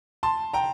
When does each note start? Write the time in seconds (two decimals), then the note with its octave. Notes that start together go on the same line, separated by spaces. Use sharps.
0.23 A5 C6
0.54 G5 A#5